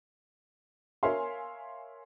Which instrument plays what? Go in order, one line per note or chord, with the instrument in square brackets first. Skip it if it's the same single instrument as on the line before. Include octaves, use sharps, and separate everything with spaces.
[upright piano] A#4 C#5 E5 F5 G#5 C6